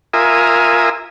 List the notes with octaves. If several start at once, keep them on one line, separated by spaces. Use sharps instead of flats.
F4 A#4 E5 G#5 D#6